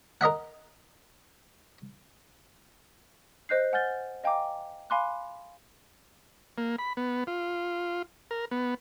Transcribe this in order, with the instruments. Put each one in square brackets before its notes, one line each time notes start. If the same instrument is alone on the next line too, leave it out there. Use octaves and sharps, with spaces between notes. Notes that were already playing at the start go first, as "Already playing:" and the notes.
[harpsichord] A#4 D#5 E5 F#5
[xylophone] C5 D#5 F#6 G6 C7
F#5 G#5 F6 G6 A6 G7
D#5 F5 G5 G#5 A#5 D6
F5 G#5 B5 C6 D6 F#6
[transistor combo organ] A#3
B5
B3
F4
A#4
B3